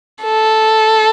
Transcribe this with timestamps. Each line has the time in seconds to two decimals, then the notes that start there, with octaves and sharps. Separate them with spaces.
0.23 A4